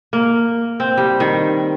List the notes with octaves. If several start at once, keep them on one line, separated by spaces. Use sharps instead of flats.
A#3
C4
G3
D#3